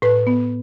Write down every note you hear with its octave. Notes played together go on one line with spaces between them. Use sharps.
A2 B4
B3